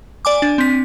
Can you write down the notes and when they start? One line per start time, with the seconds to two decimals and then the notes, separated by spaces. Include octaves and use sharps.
0.25 D5 G#5 D6
0.42 D4
0.58 C4 B6